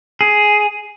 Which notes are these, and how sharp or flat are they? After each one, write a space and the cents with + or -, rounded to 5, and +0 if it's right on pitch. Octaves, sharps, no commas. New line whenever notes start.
G#4 +10